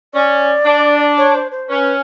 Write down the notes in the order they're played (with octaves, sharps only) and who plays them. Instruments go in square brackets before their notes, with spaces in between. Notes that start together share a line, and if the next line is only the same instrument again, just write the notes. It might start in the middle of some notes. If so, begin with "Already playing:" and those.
[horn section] C#4 [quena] D5
[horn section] D4
[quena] C#5
C5
C5
[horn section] C#4 [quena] B4